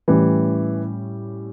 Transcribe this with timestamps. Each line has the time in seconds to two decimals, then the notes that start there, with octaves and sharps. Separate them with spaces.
0.08 A2 E3 G3 C#4 G4